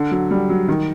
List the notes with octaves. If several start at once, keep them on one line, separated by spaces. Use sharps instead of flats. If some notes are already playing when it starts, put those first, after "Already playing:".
Already playing: D3
F#3
G3
F#3
D#3